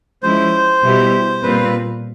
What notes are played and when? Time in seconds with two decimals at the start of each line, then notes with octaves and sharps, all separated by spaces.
0.22 F3 G#3 C#4 E4 C5
0.83 B2 G3 B3 E4 G4
1.43 A#2 G3 C4 F4 B4